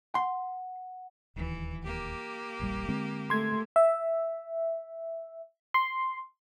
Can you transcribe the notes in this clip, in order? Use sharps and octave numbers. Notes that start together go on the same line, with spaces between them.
F#5 C6
D1 D#2 E3
A#3 G4
E1 A#1 G3
D3 G#3 C4
A3 C6 G#6
E5
C6